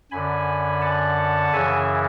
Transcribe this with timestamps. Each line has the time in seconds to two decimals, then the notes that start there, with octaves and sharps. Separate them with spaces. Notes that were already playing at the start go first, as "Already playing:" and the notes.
0.11 F#2 D3 G#5 B5
0.82 F#5 A5
1.53 F#2 C#3 E3 E5 G#5